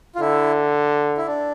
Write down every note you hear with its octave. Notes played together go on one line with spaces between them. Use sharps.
F4
D3 E4
E4
D4